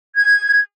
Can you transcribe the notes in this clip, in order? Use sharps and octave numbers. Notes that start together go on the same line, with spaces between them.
G#6